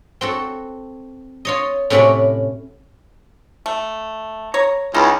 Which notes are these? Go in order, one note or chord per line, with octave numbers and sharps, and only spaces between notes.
C4 F#4 A4
F4 C#5 D#5
A2 C3 C#4 F#4 D5 B5
A3
C#5 A#5
C#2 C#4 D#4 E4